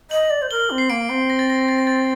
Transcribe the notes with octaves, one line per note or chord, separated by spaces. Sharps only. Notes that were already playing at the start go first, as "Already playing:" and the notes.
D#5 F#7
D5
C5
A#4 G7
C4
C7
A#3 D7
C4
A#6
A6
A#6
A6
A#6
A6